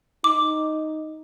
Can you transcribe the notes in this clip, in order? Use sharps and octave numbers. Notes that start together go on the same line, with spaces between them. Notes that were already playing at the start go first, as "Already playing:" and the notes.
D#4 D6